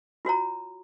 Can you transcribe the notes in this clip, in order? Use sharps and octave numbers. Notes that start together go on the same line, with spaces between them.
F4 F#4 C#5 A#5